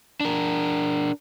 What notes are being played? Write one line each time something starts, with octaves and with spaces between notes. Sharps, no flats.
D4 A#4